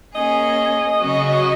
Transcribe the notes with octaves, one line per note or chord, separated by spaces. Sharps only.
A#3 C#4 G#4 D#5
C#3 F#3 C#4 F#4